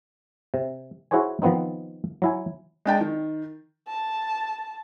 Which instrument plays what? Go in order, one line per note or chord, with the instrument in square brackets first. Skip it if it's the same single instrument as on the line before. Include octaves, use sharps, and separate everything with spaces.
[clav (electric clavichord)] C3
E4 F#4 G#4 C5 C#5 G#5
D#3 F3 B3 C4 D#4
F#3 E4 G#5
[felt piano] G#3 D4 G5 A5
D#3
[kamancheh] A5